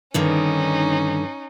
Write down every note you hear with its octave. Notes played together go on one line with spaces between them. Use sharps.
G2 D3 D#3 C#4 D#4